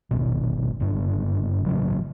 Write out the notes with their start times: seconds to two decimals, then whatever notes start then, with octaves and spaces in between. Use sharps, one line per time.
0.11 D#1 G#1 B2
0.80 F#1 G2 D4
1.66 A1 C#3 F#3